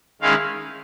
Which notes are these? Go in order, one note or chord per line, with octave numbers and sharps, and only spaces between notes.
D#3 G#3 C#4 E4 F5